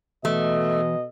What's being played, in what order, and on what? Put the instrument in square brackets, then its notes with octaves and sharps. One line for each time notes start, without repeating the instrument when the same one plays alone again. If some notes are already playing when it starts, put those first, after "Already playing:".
[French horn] B2 [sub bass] E3 [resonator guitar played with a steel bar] A3 [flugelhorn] D#5